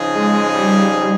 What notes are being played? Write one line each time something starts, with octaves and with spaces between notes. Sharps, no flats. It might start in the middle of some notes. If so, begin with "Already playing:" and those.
Already playing: C#3 F3 C4 D#4 G#4
G#3
G3